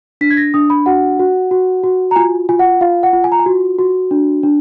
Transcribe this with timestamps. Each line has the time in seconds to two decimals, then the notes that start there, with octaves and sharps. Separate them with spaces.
0.21 D4 B6
0.31 G#6
0.37 A#6
0.54 D4 D#6
0.70 B5
0.86 F#4 F#5
1.19 F#4
1.51 F#4
1.83 F#4
2.11 A#5
2.16 F4 G#5
2.49 F4 G#5
2.59 F#5
2.81 F4 F5
3.03 F#5
3.13 F4
3.24 G#5
3.32 A#5
3.39 G#5
3.46 F#4
3.79 F#4
4.11 D4
4.43 D4